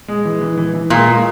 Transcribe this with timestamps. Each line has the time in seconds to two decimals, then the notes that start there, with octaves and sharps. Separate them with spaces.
0.08 G#3
0.25 E3
0.41 E3
0.58 E3
0.74 E3
0.90 A#2 G#3
1.07 G#3